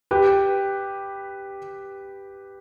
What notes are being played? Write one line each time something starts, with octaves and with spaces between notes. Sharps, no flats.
G4 B4